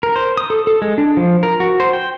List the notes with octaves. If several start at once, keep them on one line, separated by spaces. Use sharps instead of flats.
A#4
C5
D#6
A4
A4
G#3
D4
F3
A#4
F#4
C5
G5